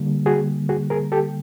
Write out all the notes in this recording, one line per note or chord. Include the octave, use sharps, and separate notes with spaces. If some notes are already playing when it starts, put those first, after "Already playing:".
Already playing: D3 G3 A#3
F#4 G#4
F#4 G#4
G#4 A#4
G4 A4